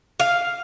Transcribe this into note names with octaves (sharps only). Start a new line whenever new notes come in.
F5